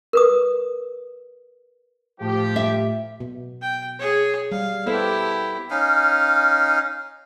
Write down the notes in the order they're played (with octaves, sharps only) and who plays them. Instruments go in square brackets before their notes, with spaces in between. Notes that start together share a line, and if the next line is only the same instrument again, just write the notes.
[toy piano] A#4 B4 D#6
[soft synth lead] A2 [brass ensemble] F3 G4
[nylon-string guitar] E5
[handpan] B2
[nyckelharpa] G5
G#4 C#5
[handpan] G3 [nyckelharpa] F5
[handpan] B3 A4 C5 [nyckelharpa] E4 G4
[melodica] C#4 D#4 F5